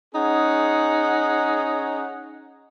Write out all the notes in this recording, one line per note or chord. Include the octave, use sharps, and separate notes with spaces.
C#4 D#4 G#4 F#5